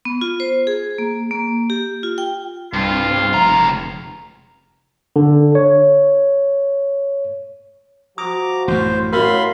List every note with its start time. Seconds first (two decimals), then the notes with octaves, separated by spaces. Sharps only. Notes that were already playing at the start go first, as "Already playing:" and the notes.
0.05 B3
0.21 F4
0.40 C5
0.67 G#4
0.98 A#3
1.31 A#3
1.70 G4
2.03 F4
2.18 G5
2.73 C2 G2 F4
3.11 C4
3.34 F1 C#2 A#5
5.16 D3
5.55 C#5
8.18 F3 F#4 A#5 D6 D#6
8.68 A1 F#2 A2 C5
9.13 F#2 A2 F#4 A#4 F5 B5 C6